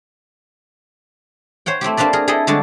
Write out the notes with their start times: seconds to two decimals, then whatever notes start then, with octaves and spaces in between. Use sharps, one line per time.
1.66 C5 C#5 F#5 G5
1.81 A3 C4 E4 G4
1.97 A#3 C4 D4 B4 D5
2.13 G#4 A#4
2.28 E4 G#4 A4 D#5 G5
2.47 D3 G3 G#3 D4 F#4 A4